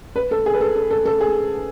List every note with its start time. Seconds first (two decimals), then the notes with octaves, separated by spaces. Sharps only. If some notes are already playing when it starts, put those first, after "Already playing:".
0.16 B4
0.31 A4
0.46 G#4
0.54 B4
0.61 A4
0.76 A4
0.91 A4
1.05 A4
1.21 G#4